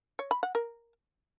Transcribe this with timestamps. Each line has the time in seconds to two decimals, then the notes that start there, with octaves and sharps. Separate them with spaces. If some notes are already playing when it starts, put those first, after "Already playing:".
0.19 C#5
0.31 B5
0.43 F#5
0.55 A#4